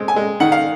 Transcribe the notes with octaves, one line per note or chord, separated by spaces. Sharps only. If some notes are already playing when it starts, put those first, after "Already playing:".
Already playing: G#3 C4
G#5
G#3
D#3 F#5
F5